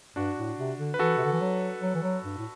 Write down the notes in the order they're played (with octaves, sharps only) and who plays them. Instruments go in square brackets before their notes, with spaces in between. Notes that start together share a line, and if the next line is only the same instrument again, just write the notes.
[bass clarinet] G2 [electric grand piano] D4 F#4
[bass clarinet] A2
C3
D3
[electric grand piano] B4
[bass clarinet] E3 [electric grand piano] F#4 A4
[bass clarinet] C3
D3
E3
F#3
F#3
E3
F#3
G2
A2